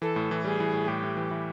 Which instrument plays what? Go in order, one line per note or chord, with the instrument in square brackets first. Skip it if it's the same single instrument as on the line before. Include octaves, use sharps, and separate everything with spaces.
[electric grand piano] E3 [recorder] A4
[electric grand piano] A2
E3
[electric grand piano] G3 [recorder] G#4
[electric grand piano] E3
A2
[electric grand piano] A2 [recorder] G4
[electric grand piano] A2
E3
E3